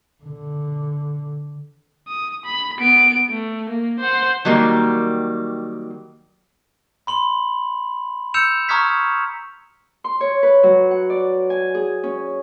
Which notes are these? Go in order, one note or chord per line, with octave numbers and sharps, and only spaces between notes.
D3
D#6
B5
B3 D7
A3
A#3
C5 F#5
D#3 F#3 G3 A#3
B5 C6 F#7
E6 G6 C#7 E7 F7
A#5 C#6 D#6 F6 G#6 B6
C6
C#5
B4
F#3
F#5
D5
G#5
G#4
C#4